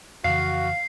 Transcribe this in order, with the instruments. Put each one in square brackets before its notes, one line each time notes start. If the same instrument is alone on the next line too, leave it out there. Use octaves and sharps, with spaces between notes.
[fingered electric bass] F2 C#3 E3 [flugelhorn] F#4 [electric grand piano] F5 [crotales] C7